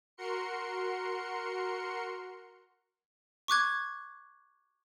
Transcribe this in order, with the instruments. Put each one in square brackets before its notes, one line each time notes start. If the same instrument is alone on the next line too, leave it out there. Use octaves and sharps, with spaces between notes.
[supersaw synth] F#4 A#4 C6 C#7
[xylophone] C#6 D6 F#6 G#6